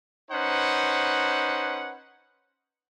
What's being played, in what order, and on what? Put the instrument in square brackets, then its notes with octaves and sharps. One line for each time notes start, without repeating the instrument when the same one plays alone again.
[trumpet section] C#4 D#4 B4 C5 F#5